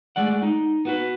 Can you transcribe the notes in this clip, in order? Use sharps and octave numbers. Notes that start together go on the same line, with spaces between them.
G#3 A3 D5 F#5
D#4
B3 F#4 B4